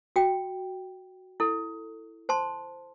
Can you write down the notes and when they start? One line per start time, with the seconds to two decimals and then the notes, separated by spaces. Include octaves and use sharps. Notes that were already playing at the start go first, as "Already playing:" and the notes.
0.16 F#4 G5
1.40 E4 A4
2.29 C5 A5 C6